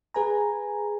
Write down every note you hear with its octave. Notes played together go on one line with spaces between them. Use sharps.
G#4 B4 G#5 A#5